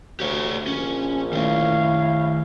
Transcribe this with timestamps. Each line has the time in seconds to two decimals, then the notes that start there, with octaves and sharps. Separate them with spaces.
0.20 D2 G4 C#5 D5
0.67 A#1 C#4
1.33 D#3 A3 E4 C#5 F5